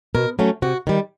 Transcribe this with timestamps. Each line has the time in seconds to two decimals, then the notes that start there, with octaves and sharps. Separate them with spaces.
0.15 B2 A#4
0.39 F#3 A3 C#4
0.62 C3 F#4
0.87 D#3 G3